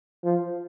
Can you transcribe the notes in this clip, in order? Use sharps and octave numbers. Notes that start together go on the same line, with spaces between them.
F3